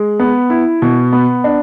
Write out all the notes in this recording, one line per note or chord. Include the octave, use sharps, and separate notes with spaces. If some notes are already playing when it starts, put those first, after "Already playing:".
Already playing: G#3
B3
E4
B2
B3
D4